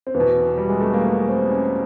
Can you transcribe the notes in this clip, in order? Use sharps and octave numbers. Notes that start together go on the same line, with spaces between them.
C4
E2 B3
B2
G3
G#3
A3
A#3
B3
C4
C#4